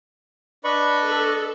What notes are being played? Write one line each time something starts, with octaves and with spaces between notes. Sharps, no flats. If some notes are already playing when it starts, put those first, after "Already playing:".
D4 B4 D5 D#5 B5 C#6
A4